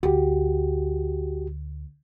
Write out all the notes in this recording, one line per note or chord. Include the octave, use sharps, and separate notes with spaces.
D2 F#4 G4